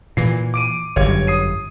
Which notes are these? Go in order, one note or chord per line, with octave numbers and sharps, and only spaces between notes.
A#2 E3 C7
D6 D7 D#7
G1 F#2 C#5 G#6
D#6 C7 D#7